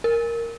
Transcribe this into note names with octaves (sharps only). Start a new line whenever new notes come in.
A#4